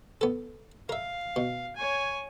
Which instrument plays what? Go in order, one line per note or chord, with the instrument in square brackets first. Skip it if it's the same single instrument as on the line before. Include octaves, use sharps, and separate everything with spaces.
[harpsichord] B3 A4
[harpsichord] A#4 E5 [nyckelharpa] F5
[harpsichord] B2
[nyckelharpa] C#5 G#5